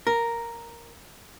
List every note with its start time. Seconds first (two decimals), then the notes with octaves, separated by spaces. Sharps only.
0.07 A#4